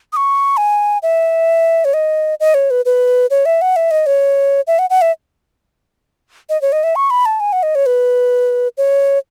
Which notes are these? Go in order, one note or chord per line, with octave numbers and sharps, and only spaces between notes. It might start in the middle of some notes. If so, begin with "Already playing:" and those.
D#6
C#6
G#5
E5
C#5
D#5
D#5
C#5
B4
B4
C#5
E5
F#5
E5
D#5
C#5
E5
F#5
F#5
E5
D#5
C#5
D#5
E5
C#6
B5
A5
G#5
F#5
D#5
C#5
B4
C#5